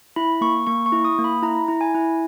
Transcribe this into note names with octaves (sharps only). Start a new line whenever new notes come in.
E4 B5
A#3 C#6
A#3 C#6
C#6
E4
D#6
A#3
B5
E4 A#5
E4
G#5
E4